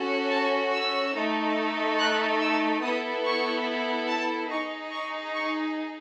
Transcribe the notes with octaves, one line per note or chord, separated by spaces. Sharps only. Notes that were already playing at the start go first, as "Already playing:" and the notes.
Already playing: C#4 F#4 A4
A5
E6
A3 D#4 A4
F#6
E6
B3 E4 A4 D#6
C#6
A5
D#4 G#4 C#6
C#6
C#6